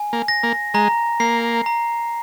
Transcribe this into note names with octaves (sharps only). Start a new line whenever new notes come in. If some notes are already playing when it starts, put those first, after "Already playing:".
Already playing: G#5
A#3
A#6
A#3
G#3 A#5
A#3 C7
A#5